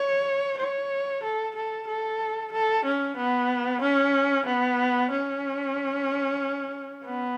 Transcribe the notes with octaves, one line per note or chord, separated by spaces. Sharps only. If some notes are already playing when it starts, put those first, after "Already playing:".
Already playing: C#5
C#5
A4
A4
A4
A4
C#4
B3
C#4
B3
C#4
B3